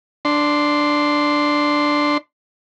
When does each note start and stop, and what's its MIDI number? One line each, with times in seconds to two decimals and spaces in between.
0.25 2.17 62
0.25 2.17 84